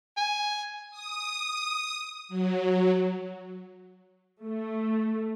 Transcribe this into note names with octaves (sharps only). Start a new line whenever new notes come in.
G#5
D#6
F#3
A3